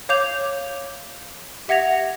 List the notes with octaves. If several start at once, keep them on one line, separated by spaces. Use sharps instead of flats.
C#5 F5 D6 G6 F7
G4 E5 F#5 G#6 A#6 F7